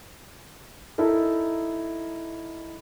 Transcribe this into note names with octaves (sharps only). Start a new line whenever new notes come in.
D#4 E4 A4 A#4